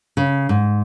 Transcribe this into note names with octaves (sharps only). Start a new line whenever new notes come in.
C#3
G#2